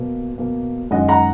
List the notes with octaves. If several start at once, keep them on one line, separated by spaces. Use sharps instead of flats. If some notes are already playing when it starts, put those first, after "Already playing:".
Already playing: B2 A#3
B2 A#3
F#2 D#3 G#3 D#5 F#5
F#5 A#5